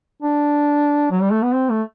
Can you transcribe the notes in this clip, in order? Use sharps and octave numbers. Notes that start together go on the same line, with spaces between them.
D4
F#3
G3
A3
B3
C4
A3